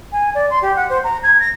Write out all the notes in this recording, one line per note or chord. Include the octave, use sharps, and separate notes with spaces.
G#5
D5
C6
G4
F#5
C5
A#5
G#6
A#6